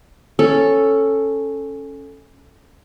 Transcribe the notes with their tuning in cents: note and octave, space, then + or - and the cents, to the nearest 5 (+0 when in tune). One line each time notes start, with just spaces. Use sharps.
C#4 -5 A4 +0